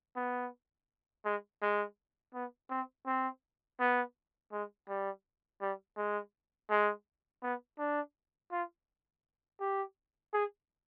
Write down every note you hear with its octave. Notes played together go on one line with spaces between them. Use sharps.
B3
G#3
G#3
B3
C4
C4
B3
G#3
G3
G3
G#3
G#3
B3
D4
F4
G4
G#4